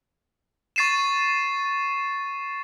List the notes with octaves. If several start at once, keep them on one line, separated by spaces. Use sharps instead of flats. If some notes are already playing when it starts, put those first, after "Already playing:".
C#6 A6 C7 D#7 E7